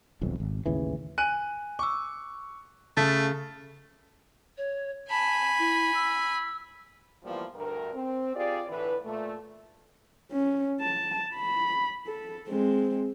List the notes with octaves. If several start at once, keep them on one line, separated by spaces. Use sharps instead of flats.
D#1 B1 F2
G#1
A1 D#2 C#3 E3
G#5 F#6 D#7
C#6 D6 E6
C#3 A3 A5 A6 B6
C#5
G#5 A5 B5
E4
E6
E3 F3 G3 A#3 B3 F4
D2 G2 A#4
C4
F4 G4 G#4 D5
A2 D3 E3 B4
A#2 A3
C#4
A5
B5
A4
G#3 C4